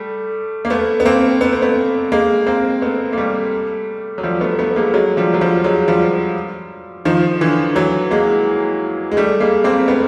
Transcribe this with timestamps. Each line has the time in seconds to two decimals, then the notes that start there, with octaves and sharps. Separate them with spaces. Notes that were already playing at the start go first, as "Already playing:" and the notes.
Already playing: G3 A3
0.65 A#3
0.70 A3 B3
1.00 B3
1.05 A#3 C4
1.41 B3
1.52 C4
1.62 A3 B3
2.12 G#3 A#3
2.47 A#3 C4
2.82 A3 B3
3.13 A#3
3.18 G3 A3
4.18 F#3
4.23 F3 G3
4.41 A3 B3
4.59 A3 B3
4.76 G#3 A#3
4.94 F#3 G#3
5.17 F3 G3
5.34 F#3
5.41 F3 G3
5.64 F#3 G#3
5.88 F3 G3
7.05 D#3 F3
7.41 D3 E3
7.76 E3 F#3
8.11 G#3 A#3
9.12 G#3
9.17 G3 A3
9.40 G#3 A#3
9.64 A#3 C4
9.88 A3 B3